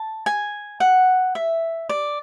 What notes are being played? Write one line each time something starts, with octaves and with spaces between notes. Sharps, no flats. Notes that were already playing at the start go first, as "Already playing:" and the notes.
Already playing: A5
G#5
F#5
E5
D5